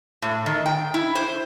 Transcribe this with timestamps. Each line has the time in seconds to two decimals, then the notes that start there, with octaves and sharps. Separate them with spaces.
0.22 A2
0.46 D#3
0.66 G5
0.94 E4
1.15 C5